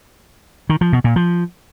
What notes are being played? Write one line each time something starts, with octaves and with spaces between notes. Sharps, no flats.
D#3
F3
B2
A#2
F3